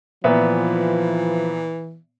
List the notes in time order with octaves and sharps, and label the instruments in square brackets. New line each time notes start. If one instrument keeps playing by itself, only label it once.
[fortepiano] A#2 B3 E5 [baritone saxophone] E3 [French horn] F3